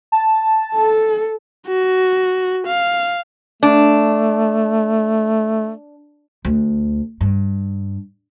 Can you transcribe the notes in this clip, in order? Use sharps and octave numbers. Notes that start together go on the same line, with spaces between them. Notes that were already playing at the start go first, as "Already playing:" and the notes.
A5
A4
F#4
F5
A3 D4
D2
G2